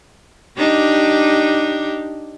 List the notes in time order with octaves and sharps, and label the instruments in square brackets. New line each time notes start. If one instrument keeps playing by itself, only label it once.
[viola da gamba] D4 D#4 G4